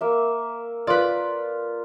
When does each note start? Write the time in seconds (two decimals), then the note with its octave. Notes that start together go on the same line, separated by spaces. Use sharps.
0.01 A#3 E5
0.87 F4 B4 D5